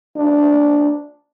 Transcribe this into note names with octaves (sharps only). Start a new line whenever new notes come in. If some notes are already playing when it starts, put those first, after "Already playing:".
D4